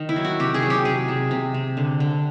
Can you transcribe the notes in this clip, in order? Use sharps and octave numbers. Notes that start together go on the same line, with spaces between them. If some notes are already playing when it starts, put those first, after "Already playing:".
Already playing: D#3
E4
F#3
F#4
C3 G4
G#4
F#3
G4
C3 G#4
C3
C3
C3
D3
D3